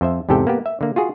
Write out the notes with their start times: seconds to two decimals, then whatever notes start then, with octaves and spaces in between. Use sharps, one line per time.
0.01 F2 C5 E5
0.29 E2 G#2 C3 G4 A4 G5
0.47 A#3 B3 G4
0.66 E5
0.81 D3 A#3
0.96 F4 F#4 G#4